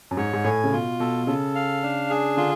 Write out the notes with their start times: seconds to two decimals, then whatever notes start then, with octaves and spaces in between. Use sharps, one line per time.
0.11 F#2
0.17 G#2 C#5
0.33 G#2
0.44 A2 G#5
0.64 C#3
0.72 B2 F4
1.00 B2 A4
1.27 C#3 A4
1.55 F5
1.83 D4
2.10 G#4
2.37 D3 F4